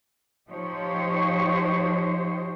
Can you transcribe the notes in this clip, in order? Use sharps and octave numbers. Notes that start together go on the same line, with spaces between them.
F3 D#4 G4 C5 C#5